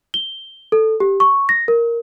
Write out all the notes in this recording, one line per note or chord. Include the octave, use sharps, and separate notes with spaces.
G7
A4
G4
C#6
A#6
A#4